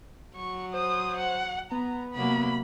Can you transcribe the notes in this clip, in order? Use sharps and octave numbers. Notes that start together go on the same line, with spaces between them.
F#3 C#6
C5 D#6
F#5
B3 A#5
C3 F#3 A#3 B5